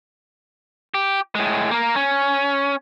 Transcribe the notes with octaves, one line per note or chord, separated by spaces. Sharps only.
G4
A2 G#3
A#3 A#4
C#4